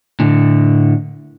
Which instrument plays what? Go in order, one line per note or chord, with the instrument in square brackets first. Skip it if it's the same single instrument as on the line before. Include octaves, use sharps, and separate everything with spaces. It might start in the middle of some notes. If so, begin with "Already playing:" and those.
[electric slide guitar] A2 D3